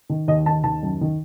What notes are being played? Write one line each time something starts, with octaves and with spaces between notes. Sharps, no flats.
D#3
D#2 D#5
D#3 A5
D#2 A5
F#2
D#3